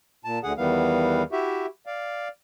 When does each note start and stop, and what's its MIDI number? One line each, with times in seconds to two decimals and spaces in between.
0.25 0.39 46
0.25 0.39 81
0.43 0.53 38
0.43 0.53 50
0.43 0.53 68
0.43 0.53 78
0.58 1.23 40
0.58 1.23 51
0.58 1.23 52
0.58 1.23 55
0.58 1.23 59
0.58 1.23 77
1.32 1.66 64
1.32 1.66 66
1.32 1.66 67
1.32 1.66 76
1.86 2.28 74
1.86 2.28 77